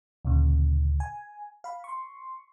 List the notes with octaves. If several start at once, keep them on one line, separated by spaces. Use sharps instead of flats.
D2 A#2 C#3
G#5
F5 B5
C6 C#6